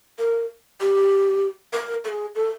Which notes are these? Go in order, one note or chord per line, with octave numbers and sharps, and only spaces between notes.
A#4
G4
A#4
A4
G#4
A4